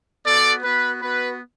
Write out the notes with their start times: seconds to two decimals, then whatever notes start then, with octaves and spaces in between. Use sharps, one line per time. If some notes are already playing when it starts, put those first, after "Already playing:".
0.24 B3 F#4 A4 D5
0.63 B3 F#4 B4
1.01 B3 F#4 B4